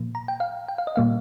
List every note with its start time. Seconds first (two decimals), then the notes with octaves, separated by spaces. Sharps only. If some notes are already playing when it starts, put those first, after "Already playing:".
Already playing: A#2 F3 A#3
0.15 A#5
0.28 G5
0.40 F5
0.68 G5
0.78 F5
0.87 D#5
0.96 A#2 G3 A#3 F5